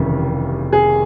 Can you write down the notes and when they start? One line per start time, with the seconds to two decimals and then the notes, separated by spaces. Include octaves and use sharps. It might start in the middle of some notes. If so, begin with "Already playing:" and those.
Already playing: F1 D#2 C#3 E3 G3
0.73 G#4